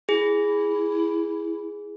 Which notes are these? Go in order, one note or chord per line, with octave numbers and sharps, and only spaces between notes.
E4 G#4